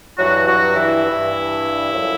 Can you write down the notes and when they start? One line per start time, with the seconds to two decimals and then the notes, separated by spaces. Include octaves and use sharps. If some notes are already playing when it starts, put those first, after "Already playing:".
0.18 G2 E3 F#3 F#4
0.47 F#3 F#4
0.76 E3 E4
1.06 G2 E3
1.92 F#2 D3 F3